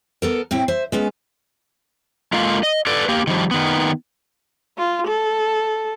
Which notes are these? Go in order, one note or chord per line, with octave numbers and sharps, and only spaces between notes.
B3 A4 A#4
A2 C4 E4 G5
C5 E5
G#3 B3 C#4
G#3 A#3 F4 A4 A#4 F5
D#5
A4 B4 D5
A#3 G4
D#3 F3 G3
D#3 B3
F4
A4